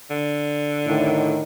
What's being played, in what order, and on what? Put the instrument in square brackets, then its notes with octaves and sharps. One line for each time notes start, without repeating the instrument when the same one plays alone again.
[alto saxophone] D3
[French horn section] A2 D#3